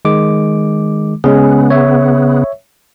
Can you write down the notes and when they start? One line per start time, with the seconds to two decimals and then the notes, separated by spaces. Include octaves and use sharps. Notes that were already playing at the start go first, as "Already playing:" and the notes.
0.05 D#3 G#3 D6
1.24 C#3 G#3 B3 C#4 G#4
1.70 C#5 E5